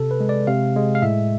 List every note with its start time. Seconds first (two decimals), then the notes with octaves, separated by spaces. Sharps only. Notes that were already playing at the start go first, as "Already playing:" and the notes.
Already playing: C3 A4
0.11 B4
0.20 G#3
0.29 D5
0.47 C3 F5
0.76 G#3
0.95 F5
1.02 A2 E5